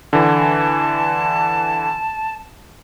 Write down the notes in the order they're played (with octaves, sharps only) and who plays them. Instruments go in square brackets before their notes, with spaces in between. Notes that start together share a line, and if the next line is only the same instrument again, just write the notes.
[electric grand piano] D3 E3 [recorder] A5